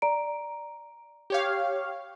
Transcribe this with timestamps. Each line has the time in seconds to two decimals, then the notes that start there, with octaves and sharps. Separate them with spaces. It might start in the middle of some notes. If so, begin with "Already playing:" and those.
0.02 D5 A#5 D7
1.30 G4 C#5 F5